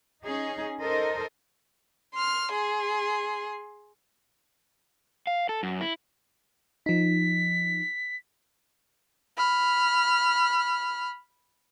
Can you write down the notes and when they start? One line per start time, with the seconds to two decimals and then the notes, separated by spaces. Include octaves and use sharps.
0.23 C#4 D#4 G#4
0.81 D#4 A4 A#4 C5 D#5
2.14 C6 F6
2.53 G#4 C6
5.27 F5
5.49 A4
5.63 F#2
5.81 E4
6.86 F3 D#4 B6
9.37 B5 F6